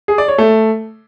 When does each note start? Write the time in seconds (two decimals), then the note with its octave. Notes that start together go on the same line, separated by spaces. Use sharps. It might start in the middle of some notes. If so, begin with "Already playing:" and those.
0.08 G#4
0.18 D5
0.28 C#5
0.38 A3